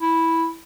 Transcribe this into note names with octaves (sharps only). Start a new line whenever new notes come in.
E4